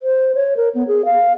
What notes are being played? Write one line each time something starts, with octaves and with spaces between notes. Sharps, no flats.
C5
C#5
A#4
B3
G#4
F5